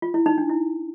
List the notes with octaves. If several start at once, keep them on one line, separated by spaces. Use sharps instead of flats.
F4
E4
D#4
D4
E4